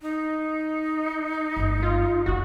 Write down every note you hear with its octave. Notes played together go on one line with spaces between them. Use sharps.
D#4
G1 A3
F4
F1 A#2 F#4